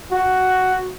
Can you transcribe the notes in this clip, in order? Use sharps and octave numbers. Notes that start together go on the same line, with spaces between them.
F#4